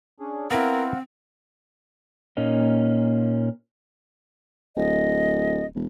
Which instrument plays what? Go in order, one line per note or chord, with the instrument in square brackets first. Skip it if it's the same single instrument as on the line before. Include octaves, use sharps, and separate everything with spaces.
[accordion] C#4 D4 G#4
[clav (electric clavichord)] B3 E4 [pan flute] C4 [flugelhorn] A#4 [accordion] C5 F5 F#5
[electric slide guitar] A#2 A#3 C#4 D#4
[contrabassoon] D1 [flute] D#5
[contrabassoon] E1